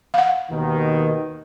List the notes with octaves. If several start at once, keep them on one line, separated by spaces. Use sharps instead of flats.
F5 F#5
D#2 B2 D#3